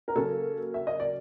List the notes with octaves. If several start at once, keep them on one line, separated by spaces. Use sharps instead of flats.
A#4
C#3 F#3 A#3 C#4 A4
E5
D#5
D5